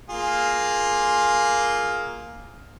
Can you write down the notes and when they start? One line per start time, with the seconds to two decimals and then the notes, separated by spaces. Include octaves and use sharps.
0.10 A#3 F4 G#4